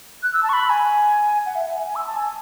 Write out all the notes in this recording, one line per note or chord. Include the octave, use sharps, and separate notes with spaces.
F#6
E6
A5
C#6
B5
G#5
F#5
E5
E5
G#5
G#5
E6
A5
G#5